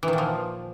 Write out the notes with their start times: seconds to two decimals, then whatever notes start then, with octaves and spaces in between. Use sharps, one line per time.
0.03 E3
0.08 D#3
0.13 A#2
0.18 F3